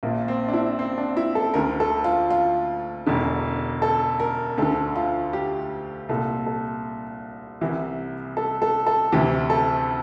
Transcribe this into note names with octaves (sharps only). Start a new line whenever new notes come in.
A#1 A#2 A#3
C4
D4
E4
C4
D4
E4
A4
D2 D3 A#4
A4
F4
F4
E1 E2 D3
A4
A#4
D2 D3 A4
F4
G4
C2 A#2 A4
A4
C2 C3 E3
A4
A4
A4
D2 C3 E3 G4
A4